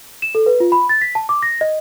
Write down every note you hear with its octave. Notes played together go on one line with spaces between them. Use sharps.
E7
A4
B4
F4
B5
A6
B6
A5
D6
A#6
D#5